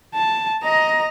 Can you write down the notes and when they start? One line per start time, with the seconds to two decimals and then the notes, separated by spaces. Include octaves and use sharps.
0.15 A5
0.64 D#5 A#5